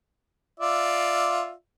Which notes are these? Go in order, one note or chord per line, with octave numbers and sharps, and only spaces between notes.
F4 D5 E5